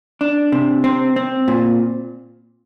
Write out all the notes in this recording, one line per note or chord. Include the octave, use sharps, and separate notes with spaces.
D4
C3
C4
C4
A#2